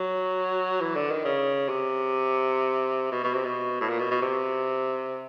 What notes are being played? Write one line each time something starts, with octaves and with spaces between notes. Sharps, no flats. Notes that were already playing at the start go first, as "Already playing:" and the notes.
Already playing: F#3
E3
D3
D#3
C#3
C3
B2
B2
C3
B2
A2
A#2
B2
B2
C3